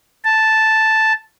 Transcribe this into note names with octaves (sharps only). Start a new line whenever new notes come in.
A5